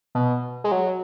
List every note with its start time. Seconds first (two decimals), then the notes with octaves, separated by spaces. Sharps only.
0.15 B2
0.64 G#3
0.72 F#3